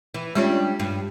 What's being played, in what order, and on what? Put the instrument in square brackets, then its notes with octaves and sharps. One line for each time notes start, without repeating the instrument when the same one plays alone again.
[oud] E3
[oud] G3 C#4 D4 [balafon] G#3 F4 C#5
[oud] G2